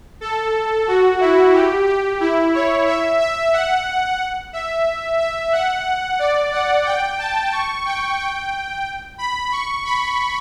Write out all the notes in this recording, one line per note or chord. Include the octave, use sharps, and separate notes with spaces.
A4
F#4
E4
G4
G4
E4
C#5
E5
E5
F#5
E5
E5
F#5
D5
F#5
G5
A5
C#6
G5
G5
B5
C#6
B5